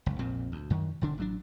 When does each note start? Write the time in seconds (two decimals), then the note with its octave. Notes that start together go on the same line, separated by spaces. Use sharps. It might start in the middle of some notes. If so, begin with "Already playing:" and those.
0.06 F#1 C#2
0.19 A#1 F2 A#2 C4
0.52 D2
0.70 F#2 D#3
1.01 E1 D3 D4
1.18 A1 F#3 D4